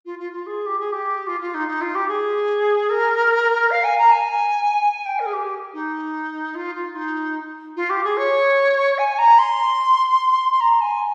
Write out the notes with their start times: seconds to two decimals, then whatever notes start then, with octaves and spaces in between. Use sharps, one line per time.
0.05 F4
0.19 F4
0.32 F4
0.46 G#4
0.66 G4
0.79 G#4
0.92 G4
1.27 F4
1.41 F4
1.54 D#4
1.68 D#4
1.81 F4
1.95 G4
2.08 G#4
2.90 A#4
3.71 F5
3.84 G#5
3.98 A#5
4.11 G#5
4.92 G#5
5.05 G5
5.19 A#4
5.26 G#4
5.33 G4
5.73 D#4
6.55 F4
6.75 F4
6.96 D#4
7.76 F4
7.90 G4
8.04 G#4
8.17 C#5
8.98 G#5
9.18 A#5
9.39 C6
10.51 C6
10.60 A#5
10.81 G#5